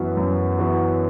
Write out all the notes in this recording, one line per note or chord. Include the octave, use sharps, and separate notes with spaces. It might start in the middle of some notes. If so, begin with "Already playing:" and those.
Already playing: F#2 E3 B3 F#4
F#2
E3 B3 F#4